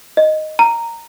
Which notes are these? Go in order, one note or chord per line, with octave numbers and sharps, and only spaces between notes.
D#5
A#5